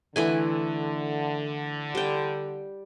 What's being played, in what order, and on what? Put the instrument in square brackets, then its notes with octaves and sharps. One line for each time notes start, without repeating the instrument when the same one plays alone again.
[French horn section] D3 [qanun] E3 A3 G#5
[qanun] G3 G5